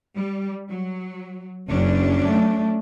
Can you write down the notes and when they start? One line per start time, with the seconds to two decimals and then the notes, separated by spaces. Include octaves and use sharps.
0.16 G3
0.69 F#3
1.69 F#1 F#3 C#4 D4
2.27 A3